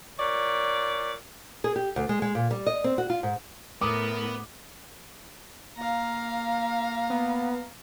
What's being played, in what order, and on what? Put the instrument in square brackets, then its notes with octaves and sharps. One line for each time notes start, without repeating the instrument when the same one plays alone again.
[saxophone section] A#2 C#5 D5
[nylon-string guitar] G#4
G4
D2
G#3
G#3
A#2
G3
D#5
C4
F#4
F4
G#2
[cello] A2 [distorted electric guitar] B3 [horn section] A#4 [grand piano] D6 D#6
[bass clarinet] A#3 [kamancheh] F5 A#5
[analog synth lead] B3